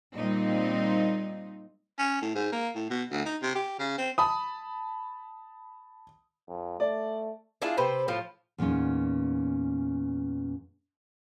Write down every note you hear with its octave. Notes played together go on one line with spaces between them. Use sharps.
A#2 G3 C4 D#4
C#4
A2
G#2
A#3
A2
B2
D2
D#4
C3
G4
C#3
C4
A5 B5 D#6
F2
A3 D5
D4 E4 F4 G#4
C3 C4 B4 C5
A2 F3 F4
E2 A#2 B3 C#4 D#4